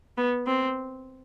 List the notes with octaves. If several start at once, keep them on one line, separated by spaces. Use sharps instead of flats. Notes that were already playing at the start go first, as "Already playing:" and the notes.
B3
C4